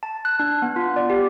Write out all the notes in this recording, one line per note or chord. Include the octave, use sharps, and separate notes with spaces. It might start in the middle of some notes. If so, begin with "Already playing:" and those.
A5
F#6
D4
B3
F4
D5
G4